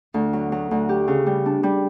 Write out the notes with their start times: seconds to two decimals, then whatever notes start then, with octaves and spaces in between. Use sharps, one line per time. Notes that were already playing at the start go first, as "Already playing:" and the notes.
0.14 D2
0.33 F#3
0.52 F#3
0.71 D2
0.89 G4
1.08 C#3
1.26 G3
1.46 D4
1.63 G3